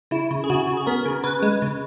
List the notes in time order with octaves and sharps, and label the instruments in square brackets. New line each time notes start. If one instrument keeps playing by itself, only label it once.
[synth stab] C#3 E4
C#3
G#4
C#3 F#4
C#3
G#4
B3 A#4
C#3
C#3 B4
G#3
C#3